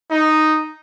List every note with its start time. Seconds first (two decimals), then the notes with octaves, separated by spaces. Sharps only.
0.11 D#4